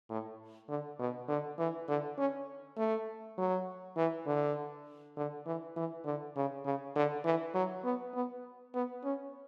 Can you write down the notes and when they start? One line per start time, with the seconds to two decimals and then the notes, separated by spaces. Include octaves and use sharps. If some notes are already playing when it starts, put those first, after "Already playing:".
0.10 A2
0.69 D3
0.99 B2
1.28 D3
1.59 E3
1.88 D3
2.18 C#4
2.77 A3
3.38 F#3
3.97 E3
4.26 D3
5.17 D3
5.46 E3
5.76 E3
6.05 D3
6.36 C#3
6.65 C#3
6.96 D3
7.25 E3
7.55 F#3
7.84 B3
8.14 B3
8.74 B3
9.04 C#4